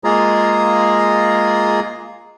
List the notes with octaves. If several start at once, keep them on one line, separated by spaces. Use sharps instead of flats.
G#3 A#3 F4 G#4 A#5